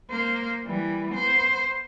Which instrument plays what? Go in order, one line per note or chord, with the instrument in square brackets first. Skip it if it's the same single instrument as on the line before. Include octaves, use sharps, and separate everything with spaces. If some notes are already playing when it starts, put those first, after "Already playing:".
[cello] A#3 C5
E3 G3
B3 C5